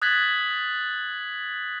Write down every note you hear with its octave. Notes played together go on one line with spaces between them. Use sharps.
D#6 F#6 G#6 A6 B6 F#7